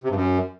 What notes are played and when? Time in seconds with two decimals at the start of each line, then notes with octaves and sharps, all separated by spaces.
0.04 C3
0.10 G2
0.15 F#2